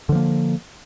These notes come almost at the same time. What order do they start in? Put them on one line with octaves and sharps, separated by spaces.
D3 F3 A#3